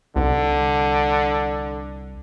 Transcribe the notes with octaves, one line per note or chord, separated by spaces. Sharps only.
C2 D3